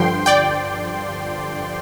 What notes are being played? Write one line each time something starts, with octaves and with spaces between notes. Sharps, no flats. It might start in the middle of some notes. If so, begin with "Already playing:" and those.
Already playing: G2 D3 F3 G5 C6
D5 G5